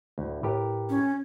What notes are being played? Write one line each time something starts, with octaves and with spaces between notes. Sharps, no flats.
D2 A2
A2 G4 A#4 B4
C#4